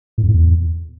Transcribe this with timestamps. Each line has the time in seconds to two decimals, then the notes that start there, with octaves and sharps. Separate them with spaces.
0.18 A2
0.23 F2
0.28 A2
0.34 E2